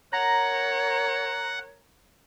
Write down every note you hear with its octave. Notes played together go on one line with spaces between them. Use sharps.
A#4 C#5 F#5 A#5 A#6